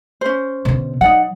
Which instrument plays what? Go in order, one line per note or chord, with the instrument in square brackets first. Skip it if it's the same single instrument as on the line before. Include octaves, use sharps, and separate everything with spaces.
[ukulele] C#4 C5
[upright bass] B2 D3
[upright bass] F#3 [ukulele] D#4 D5 F#5